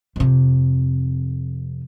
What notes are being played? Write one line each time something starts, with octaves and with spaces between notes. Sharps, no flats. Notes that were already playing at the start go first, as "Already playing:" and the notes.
F2 C3